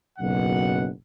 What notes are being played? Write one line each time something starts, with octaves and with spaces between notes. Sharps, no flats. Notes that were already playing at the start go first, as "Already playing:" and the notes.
F#1 B1 F#2 B2 F#5